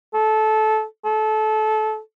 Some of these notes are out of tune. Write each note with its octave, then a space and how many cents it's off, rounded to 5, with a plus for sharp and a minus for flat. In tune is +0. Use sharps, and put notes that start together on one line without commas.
A4 -20
A4 -25